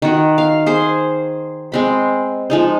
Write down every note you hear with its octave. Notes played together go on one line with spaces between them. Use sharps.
D#3 F#4
F5
G#4 C5
G#3 C4 B5
F3 G#3 D#4